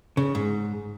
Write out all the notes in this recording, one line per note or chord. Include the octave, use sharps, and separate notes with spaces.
C#3
G#2